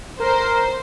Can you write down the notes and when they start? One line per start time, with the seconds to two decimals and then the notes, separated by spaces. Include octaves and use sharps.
0.19 A#4 C5